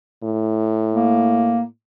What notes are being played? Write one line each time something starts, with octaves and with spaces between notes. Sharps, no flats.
A2
A#3